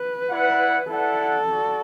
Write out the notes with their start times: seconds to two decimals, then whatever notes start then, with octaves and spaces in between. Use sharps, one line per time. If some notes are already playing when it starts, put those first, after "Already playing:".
Already playing: B4
0.29 E4 D5 F#5
0.90 E4 A4 D5 F#5
1.51 F#4 D5